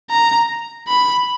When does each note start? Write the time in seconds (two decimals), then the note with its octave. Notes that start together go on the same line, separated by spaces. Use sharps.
0.10 A#5
0.88 B5